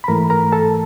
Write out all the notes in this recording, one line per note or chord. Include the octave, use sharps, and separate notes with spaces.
B5
G#2 E3 A3 A#4 A#5
A#4 A#5
A4 A5